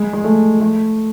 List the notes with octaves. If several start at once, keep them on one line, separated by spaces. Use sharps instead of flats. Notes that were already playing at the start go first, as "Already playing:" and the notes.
Already playing: G#3
G#3
A3
A3